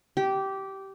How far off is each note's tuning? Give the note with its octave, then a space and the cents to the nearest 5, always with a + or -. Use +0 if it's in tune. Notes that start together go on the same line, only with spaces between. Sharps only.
G4 -15